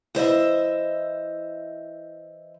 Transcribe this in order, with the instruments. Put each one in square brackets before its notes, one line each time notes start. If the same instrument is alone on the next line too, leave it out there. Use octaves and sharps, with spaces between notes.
[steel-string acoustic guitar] E3 C5 D#5 E5